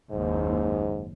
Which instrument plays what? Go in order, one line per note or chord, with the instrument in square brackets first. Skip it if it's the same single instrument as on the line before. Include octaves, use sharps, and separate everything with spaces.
[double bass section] F#1 D#2 [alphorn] G#2